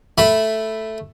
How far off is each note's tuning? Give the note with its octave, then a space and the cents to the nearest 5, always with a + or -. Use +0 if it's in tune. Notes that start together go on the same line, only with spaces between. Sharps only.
A3 +0 E5 +0 B5 +0